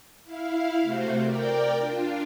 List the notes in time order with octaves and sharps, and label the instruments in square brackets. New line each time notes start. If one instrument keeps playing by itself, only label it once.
[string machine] E4 F5
C3 A3 F#4 C5
A#4 D5 G5
D4 F4